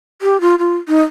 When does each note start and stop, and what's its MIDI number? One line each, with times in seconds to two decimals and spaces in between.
0.22 0.40 67
0.41 0.55 65
0.59 0.77 65
0.88 1.01 63